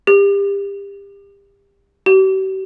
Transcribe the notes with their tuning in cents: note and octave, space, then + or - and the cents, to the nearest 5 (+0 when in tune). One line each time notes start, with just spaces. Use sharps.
G4 +30
G4 -45